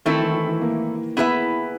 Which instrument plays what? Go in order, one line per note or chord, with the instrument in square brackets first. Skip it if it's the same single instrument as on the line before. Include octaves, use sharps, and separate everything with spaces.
[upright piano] D#3 [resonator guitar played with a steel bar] A3 C4 E4 A4
[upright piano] E3
E3
E3
A#3
[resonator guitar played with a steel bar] B3 E4 G#4 B4 E5